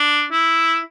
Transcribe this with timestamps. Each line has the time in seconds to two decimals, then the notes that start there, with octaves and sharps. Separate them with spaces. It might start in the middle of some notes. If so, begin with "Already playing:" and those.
Already playing: D4
0.32 E4